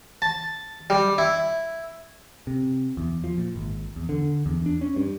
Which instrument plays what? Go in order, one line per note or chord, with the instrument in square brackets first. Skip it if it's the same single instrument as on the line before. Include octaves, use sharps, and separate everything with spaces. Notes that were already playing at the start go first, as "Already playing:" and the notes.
[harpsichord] A5
G3
E4
[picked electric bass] C3
E2
F3
A#2
G#1
E2
D3
E2
D4
C#4
G2